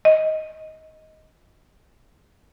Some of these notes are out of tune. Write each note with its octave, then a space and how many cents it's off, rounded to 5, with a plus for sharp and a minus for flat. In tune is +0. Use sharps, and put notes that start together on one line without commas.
D#5 +10